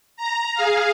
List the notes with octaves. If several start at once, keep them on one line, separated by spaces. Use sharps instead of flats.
A#5
G#4 F5